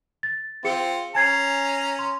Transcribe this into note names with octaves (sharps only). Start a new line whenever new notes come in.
A6
C4 F4 G#4 C#7
C#4 G#5 A#5 G#6 C7
C6